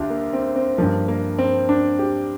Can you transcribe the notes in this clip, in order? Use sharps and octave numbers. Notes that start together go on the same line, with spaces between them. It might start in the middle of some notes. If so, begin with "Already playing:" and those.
Already playing: D2 D4 F4 G4
A#3
C4
C4
G2 F3 A#3
A#3
C4
D4
G4